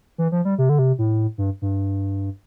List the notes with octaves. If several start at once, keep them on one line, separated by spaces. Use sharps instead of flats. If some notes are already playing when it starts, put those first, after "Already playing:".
E3
F3
G3
C3
D3
C3
A2
G2
G2